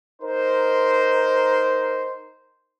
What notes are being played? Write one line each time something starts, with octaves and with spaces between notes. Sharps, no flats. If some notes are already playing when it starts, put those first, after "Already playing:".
D#4 A#4 C5